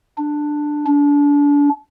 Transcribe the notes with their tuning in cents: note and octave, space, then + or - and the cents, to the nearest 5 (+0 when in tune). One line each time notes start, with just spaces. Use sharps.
D4 +10
D4 -30